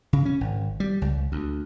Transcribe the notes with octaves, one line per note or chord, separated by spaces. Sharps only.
C#3
C#4
G#1
G3
C#2
D2